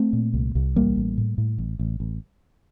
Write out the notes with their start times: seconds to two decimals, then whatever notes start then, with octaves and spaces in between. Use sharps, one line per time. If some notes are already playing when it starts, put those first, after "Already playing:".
Already playing: A3 C4
0.13 A#2
0.34 C2
0.55 C2
0.76 A1 G3 A#3
0.96 A1
1.18 A2
1.38 A2
1.58 A1
1.79 A1
2.00 A1